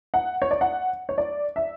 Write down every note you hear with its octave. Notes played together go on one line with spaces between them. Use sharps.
F#5
C#5
D5
F#5
C#5
D5
E5